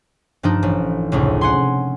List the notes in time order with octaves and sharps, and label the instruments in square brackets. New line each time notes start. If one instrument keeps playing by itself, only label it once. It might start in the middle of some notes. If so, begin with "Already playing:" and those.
[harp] G2 F3 D4 D#4
A1
F1 C#2 A2
F#5 G#5 C6